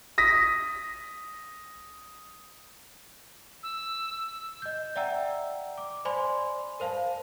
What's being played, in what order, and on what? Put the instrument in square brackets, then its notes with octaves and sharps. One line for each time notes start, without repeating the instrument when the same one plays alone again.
[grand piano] D#6 A#6 B6
[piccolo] E6
[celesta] D#5 G6
D5 E5 F#5 G5 A#5 E6
D6
C5 D5 G#5 B5 C6
A#4 C5 F5 A5